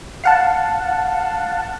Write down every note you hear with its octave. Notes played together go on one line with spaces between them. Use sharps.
F5 F#5 A5